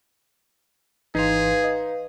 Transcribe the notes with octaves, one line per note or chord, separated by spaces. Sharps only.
G#1 E3 D#4 G#4 B4 F5 C6
D#5